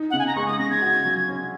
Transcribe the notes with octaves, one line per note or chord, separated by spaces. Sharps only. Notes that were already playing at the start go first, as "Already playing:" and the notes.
Already playing: D#4
C#3 F#5
G#5
A#5
G#3 C#6
D#6
C#3 A#6
G#6
F#4
F#3
C#4